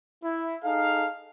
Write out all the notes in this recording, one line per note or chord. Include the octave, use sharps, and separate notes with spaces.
E4
D#4 G#4 A4 F5